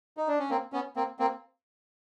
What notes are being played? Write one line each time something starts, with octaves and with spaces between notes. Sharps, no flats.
D#4
D4
C#4
A#3 C4
B3 C#4
A#3 C4
A#3 C4